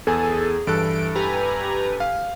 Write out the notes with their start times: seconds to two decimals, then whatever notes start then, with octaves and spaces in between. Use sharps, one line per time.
0.07 E2 G#4 A4 G#5
0.67 G2 E3 A4 F#6 D7
1.15 G4 B4 G#5 A#5
2.00 F5